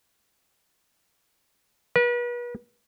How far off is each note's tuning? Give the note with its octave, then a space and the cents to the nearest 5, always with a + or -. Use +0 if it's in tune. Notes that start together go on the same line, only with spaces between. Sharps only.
B4 -40